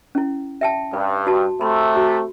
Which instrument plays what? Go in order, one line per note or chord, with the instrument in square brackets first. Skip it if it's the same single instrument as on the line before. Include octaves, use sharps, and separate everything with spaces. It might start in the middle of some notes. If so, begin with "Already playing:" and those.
[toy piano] C#4 E4
E5 G5 A5
[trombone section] G2 [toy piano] B4
[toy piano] F#4 A5
[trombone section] C3 A3 [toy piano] B5 C6
[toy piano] F#4